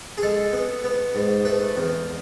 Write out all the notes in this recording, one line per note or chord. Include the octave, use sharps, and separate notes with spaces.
G#4
G#3 A4
B3
B3
G#2
A3 B4
E2